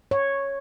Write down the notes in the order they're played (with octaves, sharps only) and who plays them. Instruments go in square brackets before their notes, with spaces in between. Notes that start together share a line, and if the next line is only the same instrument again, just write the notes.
[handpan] C#5